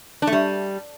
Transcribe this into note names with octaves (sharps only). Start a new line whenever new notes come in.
D4
A3
G3